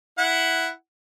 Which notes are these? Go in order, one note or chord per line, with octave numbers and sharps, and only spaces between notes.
E4 F#5